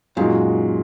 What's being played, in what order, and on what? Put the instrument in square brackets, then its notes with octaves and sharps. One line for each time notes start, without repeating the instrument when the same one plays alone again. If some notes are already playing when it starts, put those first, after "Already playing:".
[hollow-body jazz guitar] F#2 [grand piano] A#2 G#3 D#4 F#4